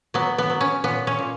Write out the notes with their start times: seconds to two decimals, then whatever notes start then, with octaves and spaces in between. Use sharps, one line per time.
0.14 F#3 B3
0.38 B3
0.50 F#3
0.61 C#4
0.84 A#2 B3
1.07 C#4
1.19 A#2